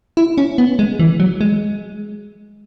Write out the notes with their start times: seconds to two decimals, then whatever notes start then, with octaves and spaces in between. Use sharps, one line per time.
0.17 E4
0.38 C#4
0.58 B3
0.79 G#3
0.99 E3
1.20 F#3
1.41 G#3